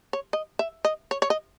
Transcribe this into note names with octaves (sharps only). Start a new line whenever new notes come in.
C#5
D#5
E5
D#5
C#5
C#5
D#5